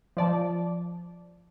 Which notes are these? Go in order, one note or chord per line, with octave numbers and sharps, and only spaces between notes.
F3 D5 A5